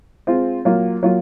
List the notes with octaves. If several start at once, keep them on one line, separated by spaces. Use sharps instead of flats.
G#3 C4 F4
F#3 A#3 F4
F#3 A#3 F4